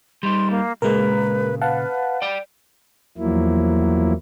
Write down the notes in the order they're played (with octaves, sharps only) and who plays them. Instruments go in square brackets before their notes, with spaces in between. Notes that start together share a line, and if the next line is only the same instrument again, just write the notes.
[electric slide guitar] G3 D#4 [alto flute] C6
[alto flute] A#3
[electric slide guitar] A#2 C#3 A#3 [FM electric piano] G#3 A#4 [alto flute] B4
[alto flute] B4 [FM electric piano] F5 F#5 A5
[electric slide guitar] D5 G5
[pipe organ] E2 F3 F#3 A#3 E4